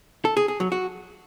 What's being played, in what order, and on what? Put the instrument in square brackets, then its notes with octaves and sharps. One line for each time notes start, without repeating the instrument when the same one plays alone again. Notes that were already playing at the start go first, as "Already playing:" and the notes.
[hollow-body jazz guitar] A4
G#4
G#4
F#3
F#4